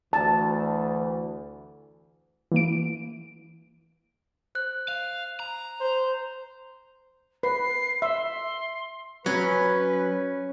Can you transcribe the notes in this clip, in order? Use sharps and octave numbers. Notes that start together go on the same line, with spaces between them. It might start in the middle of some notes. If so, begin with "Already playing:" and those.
D2 E3 A5
E3 A#3 D7
C5 F#6
F5
A#5
C5
B4 C7
E5 C6
F#3 C#4 B4